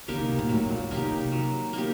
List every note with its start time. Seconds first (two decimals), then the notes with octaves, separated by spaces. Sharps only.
0.08 C#3 A#3 D#4 G4
0.19 C3
0.29 B2
0.39 A#2
0.49 A2 F#3
0.65 A2
0.70 A#2
0.91 B2 A#3 D#4 G4
1.12 C3
1.32 F#3
1.73 A#3 D#4 G4